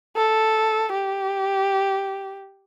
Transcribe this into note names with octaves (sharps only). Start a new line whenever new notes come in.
A4
G4